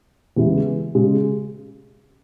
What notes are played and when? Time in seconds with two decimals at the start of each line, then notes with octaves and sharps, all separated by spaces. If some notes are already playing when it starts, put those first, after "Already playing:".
0.36 E2 C#3 G#3 B3 E4
0.95 C#3 G#3